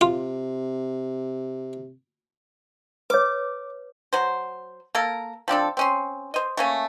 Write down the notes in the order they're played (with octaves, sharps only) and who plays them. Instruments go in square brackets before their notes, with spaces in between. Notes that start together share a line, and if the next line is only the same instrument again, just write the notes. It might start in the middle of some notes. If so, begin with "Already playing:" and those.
[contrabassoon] C3 [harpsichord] F4
[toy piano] B4 C#5 [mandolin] D6
[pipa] F#3 C5
A#3 A4 A#4
F3 C4 D4 A4
C4 C#4 C6
C5 D#5
A3 A#3 C#4